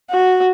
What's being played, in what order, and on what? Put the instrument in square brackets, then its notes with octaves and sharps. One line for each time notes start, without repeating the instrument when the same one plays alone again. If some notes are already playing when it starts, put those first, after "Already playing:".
[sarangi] F#4